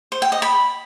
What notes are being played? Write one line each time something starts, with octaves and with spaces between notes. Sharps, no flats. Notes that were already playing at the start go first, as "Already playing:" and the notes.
C5
G5
D#5
B5